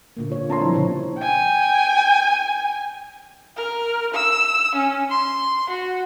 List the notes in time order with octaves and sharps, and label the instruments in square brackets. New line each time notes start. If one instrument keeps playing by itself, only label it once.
[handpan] A#2 D3 A#3
F4 C#5
[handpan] C4 D4 C#5 [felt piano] A5 A#5 C6
[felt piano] F3 E4 [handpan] G3
[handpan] A#2 C#3 C#5
[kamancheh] G5 G#5
A#4
E6
C#4
C6
F#4